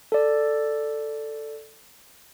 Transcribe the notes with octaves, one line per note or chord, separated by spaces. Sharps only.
A4 D5